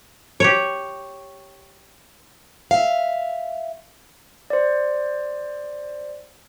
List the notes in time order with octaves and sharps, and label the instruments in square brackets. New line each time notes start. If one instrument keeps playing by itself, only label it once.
[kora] G4 C#5
[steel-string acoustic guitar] E5 F5
[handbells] C5 D5